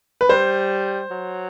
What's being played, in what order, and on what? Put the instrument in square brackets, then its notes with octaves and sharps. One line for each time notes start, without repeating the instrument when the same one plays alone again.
[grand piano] B4
[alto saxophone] G3 [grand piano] C5
[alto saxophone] F#3